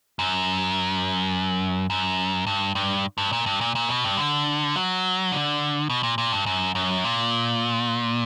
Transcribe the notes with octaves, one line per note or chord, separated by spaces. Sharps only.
F#2
F#2
G2
G2
G2
A#2
G2
A#2
A#2
B2
G2
D3
F#3
D3
B2
A#2
A#2
G2
F#2
F#2
A#2